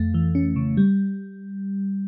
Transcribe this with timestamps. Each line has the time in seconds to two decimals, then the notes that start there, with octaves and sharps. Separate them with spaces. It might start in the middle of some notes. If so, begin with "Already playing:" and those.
Already playing: F2 A3
0.14 E3
0.35 C#4
0.56 C#3
0.77 G3